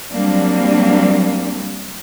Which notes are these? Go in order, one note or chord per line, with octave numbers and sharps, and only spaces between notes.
F#3 G3 A#3 C4 D4